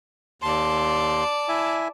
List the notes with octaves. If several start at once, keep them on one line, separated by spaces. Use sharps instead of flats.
D#2 D5 A5 C6
E4 E5 G#5